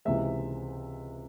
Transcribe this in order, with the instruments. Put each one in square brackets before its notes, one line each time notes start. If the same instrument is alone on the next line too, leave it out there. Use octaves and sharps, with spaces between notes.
[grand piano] C#2 C3 E3 G#3 E5